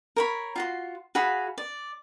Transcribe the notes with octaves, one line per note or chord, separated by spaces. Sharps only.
A#4 C#5 B5
F4 F#4 C6
F#4 G#4 F5 B5
D5